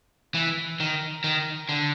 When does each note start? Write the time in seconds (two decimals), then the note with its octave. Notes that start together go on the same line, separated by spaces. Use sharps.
0.34 E3
0.80 D#3
1.24 D#3
1.69 D3